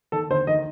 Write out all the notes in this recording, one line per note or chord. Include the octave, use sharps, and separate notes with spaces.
D#3 A4
D2 C5
D#3 D#5